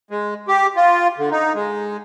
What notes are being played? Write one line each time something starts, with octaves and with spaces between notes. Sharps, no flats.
G#3
G4
F4
D3
D#4
G#3